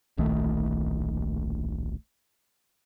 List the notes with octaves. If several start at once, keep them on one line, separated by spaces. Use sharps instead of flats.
D1 A#1 D#3 A3